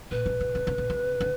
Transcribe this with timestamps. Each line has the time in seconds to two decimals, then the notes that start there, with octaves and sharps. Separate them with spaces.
0.11 A#2 B4
0.26 B2
0.40 B2
0.55 C#3
0.67 C3
0.78 B2
0.90 C3
1.20 D3